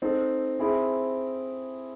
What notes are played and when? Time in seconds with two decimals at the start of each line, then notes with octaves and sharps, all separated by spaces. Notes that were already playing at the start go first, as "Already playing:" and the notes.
0.02 C4 D#4 A4 C5
0.59 C4 E4 G#4